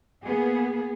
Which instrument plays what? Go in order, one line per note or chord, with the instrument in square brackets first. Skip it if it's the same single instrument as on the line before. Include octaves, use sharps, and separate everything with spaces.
[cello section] A#3 B3 G#4